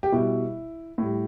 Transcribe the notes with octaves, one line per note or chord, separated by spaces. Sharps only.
G4
B2 G3 E4
A2 G3